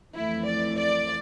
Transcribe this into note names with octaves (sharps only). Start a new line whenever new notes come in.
F2 E3 A3 E4
D5
D5